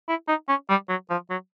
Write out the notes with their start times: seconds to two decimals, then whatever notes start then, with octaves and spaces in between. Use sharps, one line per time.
0.09 E4
0.28 D#4
0.49 C#4
0.69 G3
0.89 F#3
1.10 F3
1.30 F#3